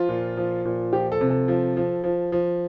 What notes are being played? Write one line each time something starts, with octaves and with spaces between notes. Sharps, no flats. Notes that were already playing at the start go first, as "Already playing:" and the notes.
Already playing: F3 F4
A#2
F3
A#2
F3 G4
A4
C3
A4
F3
F3
F3
F3